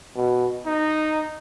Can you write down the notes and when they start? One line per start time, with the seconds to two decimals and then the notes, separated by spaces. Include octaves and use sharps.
0.15 B2
0.66 D#4